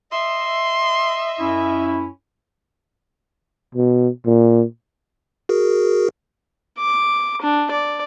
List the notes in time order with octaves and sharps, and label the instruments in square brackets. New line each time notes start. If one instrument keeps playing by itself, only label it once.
[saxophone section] D#5 E5 [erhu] C6
[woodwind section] F#2 C#4 E4
[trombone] B2
A#2
[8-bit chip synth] F#4 G#4 A#4
[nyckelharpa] D6
D4
D5